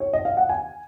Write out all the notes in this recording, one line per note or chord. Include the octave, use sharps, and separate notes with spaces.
C#5
D#5
F5
F#5
G#5